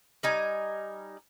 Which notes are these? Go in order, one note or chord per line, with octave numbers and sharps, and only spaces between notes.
G3 D#4 G#5